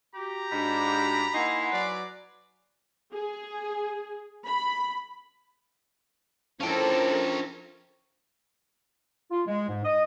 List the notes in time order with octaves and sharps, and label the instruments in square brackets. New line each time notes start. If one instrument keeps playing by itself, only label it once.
[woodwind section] F#4 G4 [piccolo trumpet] A#5
[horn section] G#2 D4 [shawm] B5
[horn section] A#3 D#4 E4 [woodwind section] F#5 G#5 B5 [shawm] C6
[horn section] F#3 B4 D5
[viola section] G#4
B5
[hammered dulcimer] F3 D4 [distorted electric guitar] C#4 G5 [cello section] E4 A4 A#4
[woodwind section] F4
G#3
G#2
D#5